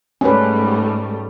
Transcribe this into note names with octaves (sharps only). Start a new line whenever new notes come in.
G#2 G3 A3 C#4 B4